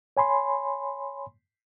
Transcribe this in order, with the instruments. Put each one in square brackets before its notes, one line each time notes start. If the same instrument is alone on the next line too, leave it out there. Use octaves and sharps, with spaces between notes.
[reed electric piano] C#5 G#5 B5 C6